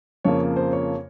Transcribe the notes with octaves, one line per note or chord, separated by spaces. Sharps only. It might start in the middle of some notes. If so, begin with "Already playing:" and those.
F2 C#3 F3 A#3 C#5
C5
C#5